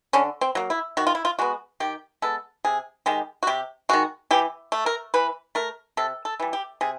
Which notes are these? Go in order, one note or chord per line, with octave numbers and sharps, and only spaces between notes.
D3 C#4
C4
F#3 A#3
E4
D#3 F#4
F4
E4
F4
G#3 B3 F#4
D#3 G4
G#3 B3 A4
C3 G#4
D#3 G#3 G4
F#4
C3 G4
D#3 G#3 F#4
E3 G4
A3
A#4
E3 B4
A3 A#4
C3 A4
A4
E3 G3
G4
C3 G#4